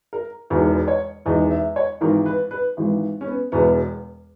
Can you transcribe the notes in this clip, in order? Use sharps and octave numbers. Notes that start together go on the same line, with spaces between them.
A#4
E1 E2 D#3
C#5
E1 E2 D#3 D#5
E5
C#5
G#1 G#2 E3 A#4
B4
B4
G#1 G#2 E3
C#4
B3
E1 E2 B2 B3